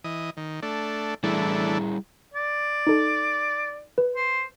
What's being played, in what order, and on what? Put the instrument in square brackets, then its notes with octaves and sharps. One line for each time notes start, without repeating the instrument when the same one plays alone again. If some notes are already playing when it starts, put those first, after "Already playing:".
[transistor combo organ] E3 D#5
D#3
A3 D4
[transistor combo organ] E3 A3 D4 [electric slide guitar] G3 E4 G#4
[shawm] D5
[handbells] D#4 A4
B4
[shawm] C5